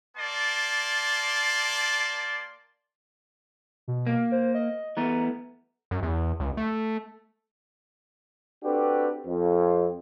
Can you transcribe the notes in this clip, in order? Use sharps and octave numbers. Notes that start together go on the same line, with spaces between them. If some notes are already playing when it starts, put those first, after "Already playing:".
A#3 D5 A5 C6
B2
A#3
C5
D#5
E3 A3 B3 A#5
F#2
E2
C#2
A3
C4 D4 F#4 G4 A4 B4
F2